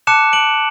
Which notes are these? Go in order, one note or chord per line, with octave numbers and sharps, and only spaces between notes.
A5 D6 F#6 C#7 E7
D7 F#7